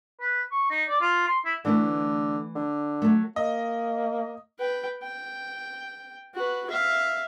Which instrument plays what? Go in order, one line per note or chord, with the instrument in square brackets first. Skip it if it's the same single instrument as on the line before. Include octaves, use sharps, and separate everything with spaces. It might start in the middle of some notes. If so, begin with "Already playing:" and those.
[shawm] B4
C#6
D#4
D5
F4
C6
E4
[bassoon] D3 [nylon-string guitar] E3 A3 E4
[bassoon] D3
[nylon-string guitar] F#3 A3
[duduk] A#3 [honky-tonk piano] D#5
[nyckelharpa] B4 G5
G5
F#4 B4
E5 F5